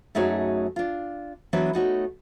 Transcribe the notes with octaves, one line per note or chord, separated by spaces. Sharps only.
F#2 A3 D#4 F#4 G#4 C#5
D4 F4
E3 F#3 B3 D4 B4 C#5
A3 D#4 F#4 C#5